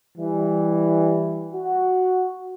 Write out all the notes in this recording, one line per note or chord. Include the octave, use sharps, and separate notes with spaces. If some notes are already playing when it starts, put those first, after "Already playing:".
E3 G3
F#4